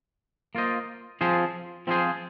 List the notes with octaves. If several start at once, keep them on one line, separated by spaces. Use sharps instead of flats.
A#3 F4 C5 D#5
F3 C4 F4 G#4 C5
F3 C4 F4 G#4 C5